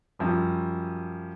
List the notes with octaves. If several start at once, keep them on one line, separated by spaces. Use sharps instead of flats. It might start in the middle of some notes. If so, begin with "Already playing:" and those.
F#2 F3 G3